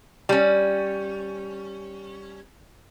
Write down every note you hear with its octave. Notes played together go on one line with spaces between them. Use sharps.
G3 C#4